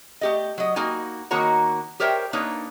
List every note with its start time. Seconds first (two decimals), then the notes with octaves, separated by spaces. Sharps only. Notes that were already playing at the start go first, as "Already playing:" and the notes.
0.21 A3 G4 D#5
0.58 F#3 D#5
0.76 A#3 D#4 F#4 G#5
1.31 D#3 A#3 D#4 F#4 C#5 A#5
2.00 G4 A#4 C5 C#5 E5 G5
2.33 A#3 D4 D#4 B4 C#5